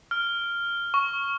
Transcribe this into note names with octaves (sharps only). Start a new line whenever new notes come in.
F6
C#6